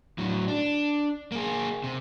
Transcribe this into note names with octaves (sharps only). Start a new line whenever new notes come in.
A2 F#3
D4
A#3 G#4
C3